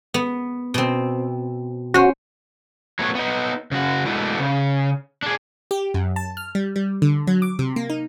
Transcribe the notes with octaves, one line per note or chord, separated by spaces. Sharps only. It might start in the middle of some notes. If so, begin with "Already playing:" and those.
B3
B2 C4
C#4 F#4 C5
F#3 A3 B3 C#5
B3 D#4
C#3 F#4
G#3 A3 B3 D4 E4 F#4
C#3
D4 G#4
G4
F#2
A5
F6
G3
G3
D3
F#3
D6
C3
A#3
D#4